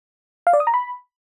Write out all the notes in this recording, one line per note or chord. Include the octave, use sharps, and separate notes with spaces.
F5
D5
D#6
A#5
B5